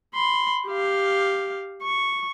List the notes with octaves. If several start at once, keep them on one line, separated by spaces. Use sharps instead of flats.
B5 C6
G4 F5
C#6